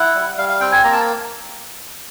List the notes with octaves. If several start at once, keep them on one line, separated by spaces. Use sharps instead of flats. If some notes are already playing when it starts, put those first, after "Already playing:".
Already playing: E4 F#5
G3
G3 F5
F5
C4 G5
G#5
A#3 A#5
A5